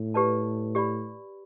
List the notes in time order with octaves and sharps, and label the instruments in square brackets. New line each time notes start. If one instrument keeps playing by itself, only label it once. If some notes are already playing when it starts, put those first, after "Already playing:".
Already playing: [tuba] A2
[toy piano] G4 B4 D5 A5
G4 D5 B5